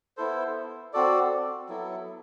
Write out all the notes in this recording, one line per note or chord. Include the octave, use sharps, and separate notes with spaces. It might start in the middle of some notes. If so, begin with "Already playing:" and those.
B3 E4 A4 C5
C4 F#4 A4 D5
F#3 B3 E4 A4